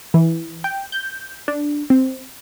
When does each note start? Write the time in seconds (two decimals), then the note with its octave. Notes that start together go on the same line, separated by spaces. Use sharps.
0.14 E3
0.64 G5
0.92 G6
1.48 D4
1.90 C4